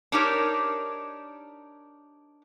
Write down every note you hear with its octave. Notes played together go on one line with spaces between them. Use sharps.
D4 D#4 G4 A#4 C#5